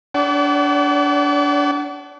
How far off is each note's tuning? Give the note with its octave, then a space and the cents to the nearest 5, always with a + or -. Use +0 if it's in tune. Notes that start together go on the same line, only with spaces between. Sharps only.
D4 -25 D5 -40 F#5 +35